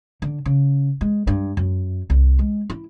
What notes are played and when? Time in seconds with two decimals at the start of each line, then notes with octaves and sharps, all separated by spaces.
0.22 D3
0.46 C#3
1.01 G#3
1.27 G2
1.57 F#2
2.10 C2
2.39 G#3
2.70 E4